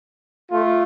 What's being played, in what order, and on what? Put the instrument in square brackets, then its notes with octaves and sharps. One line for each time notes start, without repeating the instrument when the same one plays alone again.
[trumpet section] A3 F4